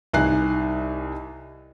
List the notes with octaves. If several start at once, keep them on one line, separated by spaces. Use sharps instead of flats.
C2 D#4 G#5 F#6 C7